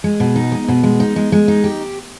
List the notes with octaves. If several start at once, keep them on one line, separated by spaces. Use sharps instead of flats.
G#3
B2
D#4
G#3
B2
G#3
D#4
G#3
G#3
D#4
G4